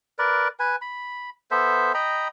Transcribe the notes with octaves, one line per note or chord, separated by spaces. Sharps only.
A#4 B4 D5
B4 G#5
B5
B3 A4 C5 E5
D#5 G5 A#5 B5